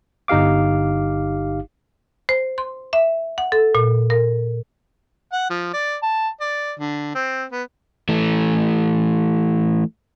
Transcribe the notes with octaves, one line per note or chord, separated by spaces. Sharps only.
G1 D#4 G4 F5 D6
C5
C6
E5
F#5
A4
A#2
A#4
F#5
F3
D5
A5
D5
D3
C4
B3
E3 A3